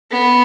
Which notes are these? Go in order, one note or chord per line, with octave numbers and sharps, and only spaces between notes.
B3